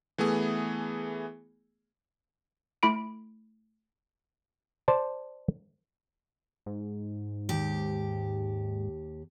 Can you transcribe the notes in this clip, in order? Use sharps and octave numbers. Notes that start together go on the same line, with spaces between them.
E3 A3 B3 G#4
A3 E4 B5 D7
C5 D5 A5
G#2
D#2 G4